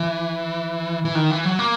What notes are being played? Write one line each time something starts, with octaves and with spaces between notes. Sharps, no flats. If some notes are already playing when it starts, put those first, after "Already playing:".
Already playing: E3
E3
D#3
E3
F#3
A#3